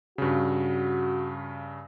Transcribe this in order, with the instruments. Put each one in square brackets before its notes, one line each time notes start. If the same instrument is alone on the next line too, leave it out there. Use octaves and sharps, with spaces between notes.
[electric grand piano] G2 C#3 [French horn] F#4